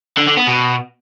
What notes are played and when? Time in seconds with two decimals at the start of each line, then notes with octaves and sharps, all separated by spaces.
0.18 D3
0.28 D3
0.38 B3
0.48 B2